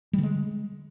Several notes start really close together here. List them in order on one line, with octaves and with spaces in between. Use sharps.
G3 D3 G#3